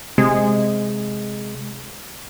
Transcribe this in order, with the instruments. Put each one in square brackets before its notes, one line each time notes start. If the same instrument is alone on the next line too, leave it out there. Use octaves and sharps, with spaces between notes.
[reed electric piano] C3 [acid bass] G#3